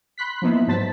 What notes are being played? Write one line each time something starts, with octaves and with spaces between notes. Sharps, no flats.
B5 C6 F#6 B6
F3 A#3 B3 D#4 E4
G#2 F#3 C5 A5 A6 B6